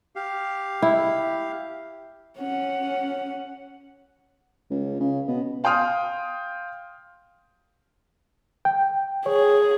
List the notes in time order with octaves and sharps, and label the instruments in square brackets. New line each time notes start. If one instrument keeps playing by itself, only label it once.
[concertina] G4 F5
[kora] E4
[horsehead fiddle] C#4 F#5
[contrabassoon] C#2
C#3
B2
[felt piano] F5 G5 C6 D#6 F6
[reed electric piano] G5
[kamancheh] G#4 [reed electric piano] C#5